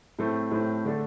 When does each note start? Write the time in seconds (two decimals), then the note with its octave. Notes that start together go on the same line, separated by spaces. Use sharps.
0.19 A2 A3 C4
0.51 A2 A3 C4
0.85 D3 A3 D4 A4